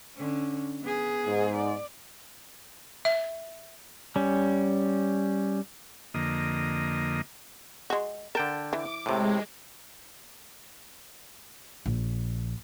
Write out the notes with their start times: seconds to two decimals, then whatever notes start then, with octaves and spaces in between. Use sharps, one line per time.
0.16 D3 C#4
0.82 B3 G#4
1.26 G#2
1.57 D5
3.05 E5
4.16 G3 C#4
6.14 F2 D3 A#3 D#5
7.90 G#3 F#4
8.35 D3 A#4 G5 A5
8.73 E3 D6
9.06 A2 C3 G#3
11.86 A#1